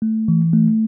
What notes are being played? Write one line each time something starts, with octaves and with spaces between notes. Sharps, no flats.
A3
E3
A3